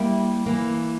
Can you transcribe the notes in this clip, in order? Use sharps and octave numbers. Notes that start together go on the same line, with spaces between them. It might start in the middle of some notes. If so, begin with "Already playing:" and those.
Already playing: G3 A#3 E4
E3 A#3